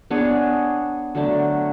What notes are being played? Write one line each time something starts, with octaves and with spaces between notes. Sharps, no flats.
B3 D4 G#4 C#5
D3 F#3 A3 D4